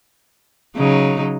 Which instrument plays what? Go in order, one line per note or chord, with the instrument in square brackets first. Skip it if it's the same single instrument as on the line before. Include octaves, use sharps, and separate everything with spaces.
[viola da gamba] C#3 F#3 D#4